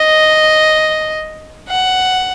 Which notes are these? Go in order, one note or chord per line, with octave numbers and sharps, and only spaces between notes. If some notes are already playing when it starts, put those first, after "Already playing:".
Already playing: D#5
F#5